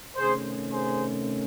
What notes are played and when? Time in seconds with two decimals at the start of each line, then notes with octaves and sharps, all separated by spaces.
0.16 C3 D#3 A3 C#4 G#4 C5
0.72 G#4 C5